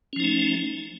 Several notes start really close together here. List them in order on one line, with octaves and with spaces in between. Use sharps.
C#4 F3 D#4 A3